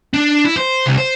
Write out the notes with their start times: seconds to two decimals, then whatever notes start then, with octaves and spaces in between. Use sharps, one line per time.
0.14 D4
0.45 E4
0.57 C5
0.86 C2
0.98 C5